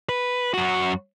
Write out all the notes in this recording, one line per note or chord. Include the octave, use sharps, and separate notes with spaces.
B4
F#2 F#4